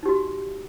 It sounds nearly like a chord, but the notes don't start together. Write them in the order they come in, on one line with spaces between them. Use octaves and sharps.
D#4 G4 F#4